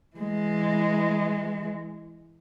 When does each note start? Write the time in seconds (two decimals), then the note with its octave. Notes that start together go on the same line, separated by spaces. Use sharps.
0.17 E3 G#3